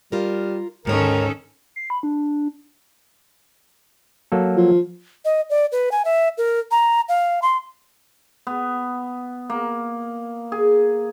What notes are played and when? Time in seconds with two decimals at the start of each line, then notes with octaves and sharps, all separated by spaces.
0.12 G3 F4 A#4
0.85 D2 G#2 D#3 C#4 A4 A#4 C#5
1.76 C7
1.90 B5
2.03 D4
4.32 F#3 A#3 A4
4.57 F3
5.25 D#5
5.50 D5
5.72 B4
5.92 G#5
6.05 E5
6.38 A#4
6.71 A#5
7.09 F5
7.42 C6
8.47 B3
9.50 A#3
10.52 G#4